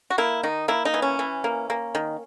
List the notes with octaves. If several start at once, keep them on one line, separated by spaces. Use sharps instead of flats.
F#4
A#3 E4
D#3 D#4
A#3 E4
D#4
E3
C#4
E3
A#3
A#3
D#3